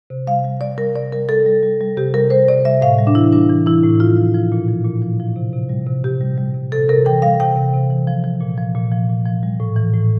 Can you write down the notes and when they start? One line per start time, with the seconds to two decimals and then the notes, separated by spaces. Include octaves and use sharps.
0.10 C3
0.27 G3 F5
0.45 G3
0.61 G3 D5
0.78 G3 A#4
0.95 C3 D5
1.12 G3 A#4
1.29 G3 A4
1.46 G3
1.63 G3
1.81 G3
1.97 C3 G4
2.14 G3 A#4
2.30 G3 C5
2.48 C3 D5
2.65 G3 E5
2.82 A2 F5
2.99 G3
3.07 D4
3.15 E3 E4
3.33 G3 D4
3.49 E3
3.66 E3 E4
3.84 A2
4.00 F3 F4
4.17 F3
4.34 F3
4.52 A#2
4.68 F3
4.85 A#2
5.02 F3
5.20 F3
5.36 C3
5.53 C3
5.69 G3
5.86 C3
6.04 C3 G4
6.21 G3
6.38 G3
6.54 C3
6.72 C3 A4
6.88 C3 A#4
7.05 E3 G5
7.22 G3 F5
7.40 C3 G5
7.56 C3
7.73 C3
7.91 E3
8.07 F3
8.24 F3
8.41 A#2
8.58 F3
8.75 A#2
8.92 F3
9.10 A#2
9.26 F3
9.43 G3
9.60 A2
9.76 E3
9.93 A2